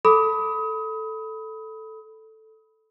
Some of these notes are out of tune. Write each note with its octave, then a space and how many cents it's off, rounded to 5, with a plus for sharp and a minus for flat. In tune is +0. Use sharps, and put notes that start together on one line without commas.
A4 +0 B5 +0 D#6 +30